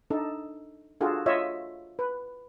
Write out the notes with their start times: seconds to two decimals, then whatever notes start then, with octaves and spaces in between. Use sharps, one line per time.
0.10 D4 D#4 A4
1.01 D4 F4 F#4 G#4 A4
1.26 F4 C#5 D#5 E5
1.99 B4